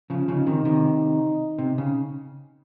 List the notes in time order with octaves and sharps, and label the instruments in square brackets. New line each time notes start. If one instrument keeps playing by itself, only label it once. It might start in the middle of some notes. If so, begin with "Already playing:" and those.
[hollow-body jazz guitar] C#3 F3
[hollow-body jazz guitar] C#3 F3 [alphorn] D#4
[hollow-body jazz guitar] C3 D#3
C3 D#3
C3
C#3